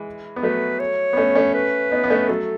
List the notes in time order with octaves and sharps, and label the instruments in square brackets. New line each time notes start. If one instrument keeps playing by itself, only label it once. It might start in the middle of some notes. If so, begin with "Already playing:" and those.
Already playing: [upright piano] E3 G#3
B3
[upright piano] F#3 A3 [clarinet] B4
[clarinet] C#5
[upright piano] B3
A3 C#4
A3 C#4
[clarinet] B4
[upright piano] B3 D#4
B3
A3 C#4
[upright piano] F#3 A3 [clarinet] A4